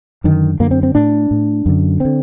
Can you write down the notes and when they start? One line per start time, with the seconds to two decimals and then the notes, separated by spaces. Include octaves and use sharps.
0.24 F#2 D3 D#3
0.60 F#2 D3 A#3
0.71 C4
0.83 C4
0.95 A2 D4
1.31 A2
1.66 F#2 D3
2.00 D3 C4